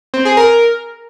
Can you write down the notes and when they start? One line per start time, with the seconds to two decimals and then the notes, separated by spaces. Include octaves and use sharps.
0.14 C4
0.25 G#4
0.37 A#4